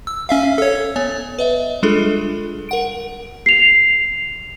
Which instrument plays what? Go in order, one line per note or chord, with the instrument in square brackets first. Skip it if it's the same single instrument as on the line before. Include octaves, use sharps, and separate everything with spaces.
[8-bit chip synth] E6
C#4 E5 F5
A4 C#5
[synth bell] B3 C#5 G#5
B4 D#5 E5
G3 G#3 D4 F4 G#4 A4
A#4 F#5 D7
[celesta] C7 F7